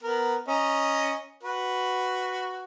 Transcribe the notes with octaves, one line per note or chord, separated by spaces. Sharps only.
B3 A#4
C#4 D#5 A#5
F#4 B4